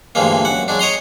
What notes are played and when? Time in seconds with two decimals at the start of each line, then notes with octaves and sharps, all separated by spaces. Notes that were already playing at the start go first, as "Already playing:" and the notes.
0.15 D2 G2 E3 F3 G#3 A#3
0.45 F#2 F#5
0.68 F#3 G#3 D4
0.79 C#5 D#5 A#5 C6